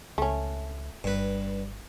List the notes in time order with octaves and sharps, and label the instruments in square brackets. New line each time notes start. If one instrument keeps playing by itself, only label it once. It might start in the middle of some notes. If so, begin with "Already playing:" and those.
[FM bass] C#2 [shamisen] A3 C#4
[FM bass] G1 [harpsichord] G2 B4